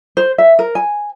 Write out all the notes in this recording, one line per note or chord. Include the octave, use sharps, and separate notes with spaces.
C5
E5
A#4
G#5